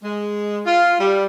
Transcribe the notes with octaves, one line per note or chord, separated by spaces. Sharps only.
G#3
F4
G3